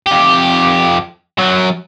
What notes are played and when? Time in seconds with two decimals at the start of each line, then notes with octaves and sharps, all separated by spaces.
0.06 F2 G4
1.38 F#2 F#3